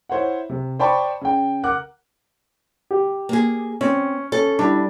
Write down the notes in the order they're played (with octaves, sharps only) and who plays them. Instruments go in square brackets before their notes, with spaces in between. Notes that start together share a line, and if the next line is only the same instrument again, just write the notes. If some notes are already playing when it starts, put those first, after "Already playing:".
[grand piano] E4 C5 C#5 F#5
C3
C5 D5 G5 A5 B5 C#6
C#3 G5
A#4 F#5 D6 F#6
[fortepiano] G4
[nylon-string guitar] A#3 G#4
[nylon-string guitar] C4 [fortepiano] C#4
[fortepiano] C#4 [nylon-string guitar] A4
[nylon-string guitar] G3 [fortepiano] D4 E4